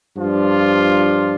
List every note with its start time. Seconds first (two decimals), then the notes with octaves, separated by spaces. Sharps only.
0.17 G2 F3 D4 F4